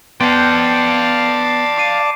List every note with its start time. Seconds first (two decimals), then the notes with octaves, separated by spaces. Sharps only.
0.21 B3 D5 F5 G5 A5 C6 G6 C7
1.77 D6 C7 D#7